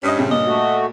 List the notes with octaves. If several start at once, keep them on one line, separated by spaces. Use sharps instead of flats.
G2 C#4 D#5 D#6 B6
A#1 C#3 C4
A#2 D#5
A3 F#4